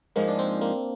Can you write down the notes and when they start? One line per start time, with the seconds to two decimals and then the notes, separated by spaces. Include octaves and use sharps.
0.16 G#2 F3 G#3 A#3 D#4
0.28 D4
0.39 C4
0.61 A#3